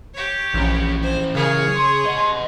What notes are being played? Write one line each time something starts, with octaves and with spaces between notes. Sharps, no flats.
G4 C#5
A#1 E3 C#4
C5
C#3 G#4 A#4 C#5
C6
D#5 F#5